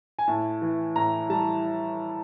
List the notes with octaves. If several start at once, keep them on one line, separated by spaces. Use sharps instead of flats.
G#5
A2 A5
E3
A2 A#5
G3 A5